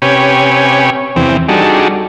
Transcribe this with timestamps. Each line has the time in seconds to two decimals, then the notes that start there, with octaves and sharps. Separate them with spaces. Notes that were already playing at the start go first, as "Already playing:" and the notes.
0.02 C3 C#4 G4 B4 C#5 G#5
1.16 E2 C3 E3 C4
1.49 G3 D4 D#4 F#4 G#4 A4